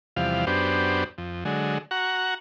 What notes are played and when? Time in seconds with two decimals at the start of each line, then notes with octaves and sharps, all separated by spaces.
0.16 E2 C3 F3 G3 F5
0.47 F#2 B3 D4 G4 C5
1.18 F2
1.45 D3 F#3 G#3
1.91 F#4 F#5 A#5 C#6